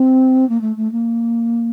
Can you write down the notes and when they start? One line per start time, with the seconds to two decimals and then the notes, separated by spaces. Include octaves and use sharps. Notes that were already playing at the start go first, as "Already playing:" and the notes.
Already playing: C4
0.49 A#3
0.61 A3
0.76 A3
0.91 A#3